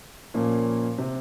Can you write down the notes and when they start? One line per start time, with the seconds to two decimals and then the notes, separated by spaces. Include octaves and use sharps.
0.34 A#2 F3 A#3 C#4
0.98 C3